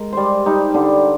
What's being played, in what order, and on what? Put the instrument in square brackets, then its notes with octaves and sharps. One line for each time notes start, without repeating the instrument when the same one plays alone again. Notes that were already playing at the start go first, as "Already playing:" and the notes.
Already playing: [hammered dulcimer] G#3 A#4
G3 C5 D5
G3 D#4
D3 D4